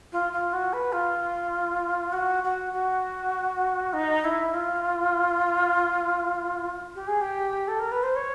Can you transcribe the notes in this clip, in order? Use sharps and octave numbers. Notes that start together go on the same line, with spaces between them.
F4
F4
F#4
B4
F4
F#4
F#4
F#4
D#4
E4
F4
G4
G#4
G4
A4
A#4
B4
C5
C#5